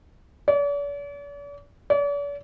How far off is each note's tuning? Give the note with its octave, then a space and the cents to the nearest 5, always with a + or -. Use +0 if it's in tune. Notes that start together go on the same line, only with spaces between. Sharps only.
D5 -45
D5 -45